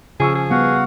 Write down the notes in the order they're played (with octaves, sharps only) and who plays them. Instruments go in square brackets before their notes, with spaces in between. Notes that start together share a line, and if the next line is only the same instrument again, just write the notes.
[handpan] C#3 [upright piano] F3 C#6 E6 [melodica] C#4 [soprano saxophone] G#4
[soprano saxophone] G#4
[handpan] G3 B3 [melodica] F#4 F5 F#5